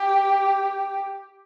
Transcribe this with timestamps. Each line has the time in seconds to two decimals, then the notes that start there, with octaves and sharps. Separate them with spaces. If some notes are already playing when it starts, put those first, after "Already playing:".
Already playing: G4